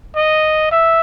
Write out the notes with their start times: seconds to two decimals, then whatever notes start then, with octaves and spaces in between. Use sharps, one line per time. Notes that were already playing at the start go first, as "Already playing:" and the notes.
0.16 D#5
0.72 E5